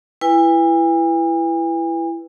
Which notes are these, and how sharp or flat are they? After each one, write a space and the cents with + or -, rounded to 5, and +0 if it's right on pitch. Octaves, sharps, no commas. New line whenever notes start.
E4 +20 B4 +0 G#5 -45